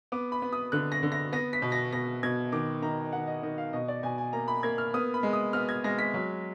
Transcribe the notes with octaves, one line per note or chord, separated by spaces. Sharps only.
B3 D6
B5
B3
D#6
D3 F#6
A#6
D3
A#6
B3 A#6
B6
B2
A#6
B2 A#6
B2 G#6
D#3 D6
D#3 A#5
D#3 F#5
D#5
D#3 D#5
F5
B2 D#5
D5
B2 G#5
G#5
A#3 A#5
B5
A#3 G#6
F6
B3 D#6
B5
G#3
D#6
B3 F6
G#6
G#3 A#6
B6
F#3